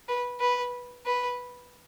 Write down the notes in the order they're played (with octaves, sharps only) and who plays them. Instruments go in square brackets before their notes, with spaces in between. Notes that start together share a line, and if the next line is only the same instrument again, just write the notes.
[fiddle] B4
B4
B4